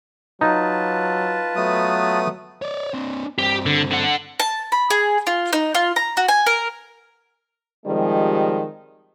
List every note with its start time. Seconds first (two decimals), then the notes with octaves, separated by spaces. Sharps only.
0.41 F#3 D#4 F4 B4 A5
1.56 F#3 A3 B3 D#6
2.62 C#5 D5
2.94 C4 D4
3.38 G2 C4 G4
3.66 D3
3.91 D3 F#5
4.40 A5
4.72 B5
4.90 G#4
5.27 F4
5.53 D#4
5.75 F4
5.96 A#5
6.17 F#4
6.28 G#5
6.46 A#4
7.85 C3 D#3 F3 G3 G#3